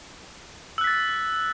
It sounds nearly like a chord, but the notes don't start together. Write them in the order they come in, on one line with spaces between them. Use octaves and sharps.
E6 F#6 B6 A6